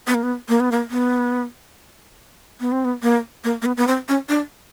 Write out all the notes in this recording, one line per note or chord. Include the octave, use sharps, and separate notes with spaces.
B3
A#3
B3
A#3
B3
A#3
B3
B3
C4
B3
A#3
A#3
A#3
B3
B3
C4
C#4
D4